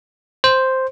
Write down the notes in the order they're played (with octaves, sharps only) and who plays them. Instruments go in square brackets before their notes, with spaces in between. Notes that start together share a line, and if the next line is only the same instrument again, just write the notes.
[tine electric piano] C5